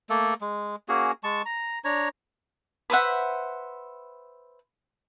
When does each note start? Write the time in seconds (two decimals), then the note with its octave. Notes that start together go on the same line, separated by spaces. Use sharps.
0.10 A3 A#3 A4
0.41 G#3
0.89 A#3 C#4 F#4 G#4
1.24 G#3 A5 C#6
1.45 A#5
1.84 D4 C#5 A#5
2.90 B4 C5 E5 F#5